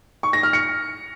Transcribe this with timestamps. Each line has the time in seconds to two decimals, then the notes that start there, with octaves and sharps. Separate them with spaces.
0.23 C#6
0.33 A#6
0.43 F6
0.53 C#7